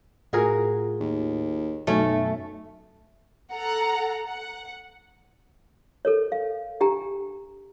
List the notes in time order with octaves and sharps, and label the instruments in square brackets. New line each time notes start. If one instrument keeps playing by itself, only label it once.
[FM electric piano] A2 F4 [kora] F#4 G#4 A#4
[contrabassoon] D#2
[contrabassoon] B1 [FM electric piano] F#2 B2 F#3 [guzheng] A3 [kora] C#4 C#5
[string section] A4 F#5 A#5
F#5
[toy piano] A4 A#4 C#5
F5
D4 G4 G5 G#5 A#5